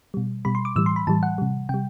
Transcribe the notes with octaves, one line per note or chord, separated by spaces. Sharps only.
B2 G3
B2 G3 B5
C6
D6
A2 E3 G3 E6
C6
B5
A2 E3 G3 A5
F#5
C3 G3
C3 G3 G5